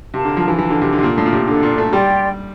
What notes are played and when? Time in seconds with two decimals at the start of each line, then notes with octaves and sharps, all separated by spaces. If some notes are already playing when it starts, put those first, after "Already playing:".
0.14 C3 A#4 F5 A5
0.25 D3
0.37 F3
0.48 E3
0.59 E3 A#4 F5 A5
0.70 D3
0.82 C3
0.92 D3
0.99 C3
1.03 A#2 D4 F4 A4
1.18 A2
1.26 A#2
1.33 C3
1.47 D3 D4 F4 A4
1.63 A#2
1.78 A3
1.93 G3 G4 D5 G5 C6